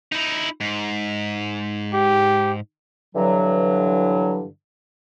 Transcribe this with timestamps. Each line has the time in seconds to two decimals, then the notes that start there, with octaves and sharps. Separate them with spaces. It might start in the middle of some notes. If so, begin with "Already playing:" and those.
0.12 D#4 E4
0.61 G#2
1.93 G4
3.15 G2 D3 E3 F#3